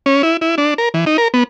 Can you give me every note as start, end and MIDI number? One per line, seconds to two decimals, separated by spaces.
0.06 0.22 61
0.23 0.37 64
0.41 0.55 64
0.58 0.74 62
0.78 0.89 70
0.94 1.05 52
1.06 1.17 63
1.18 1.28 70
1.34 1.43 59